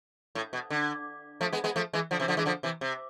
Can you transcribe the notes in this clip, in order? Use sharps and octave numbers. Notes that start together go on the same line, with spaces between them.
A2
B2
D3
F3 A3
G#3 B3
G#3 B3
F3 A3
E3 G#3
D3 F3
C3 E3
D3 F3
E3 G#3
D3 F3
C3 E3
C3